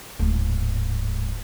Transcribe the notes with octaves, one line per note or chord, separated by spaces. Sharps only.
D1 G#2